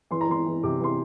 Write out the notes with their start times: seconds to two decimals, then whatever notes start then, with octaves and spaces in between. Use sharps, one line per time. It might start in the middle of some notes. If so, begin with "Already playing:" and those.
0.11 E3 C6
0.21 A#5
0.28 E3 C6
0.46 E3
0.63 C3 D6
0.80 E3 C6